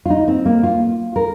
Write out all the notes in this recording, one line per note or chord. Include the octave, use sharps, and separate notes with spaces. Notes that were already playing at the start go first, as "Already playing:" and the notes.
F4
D#4
C4
A#3
F4
A#4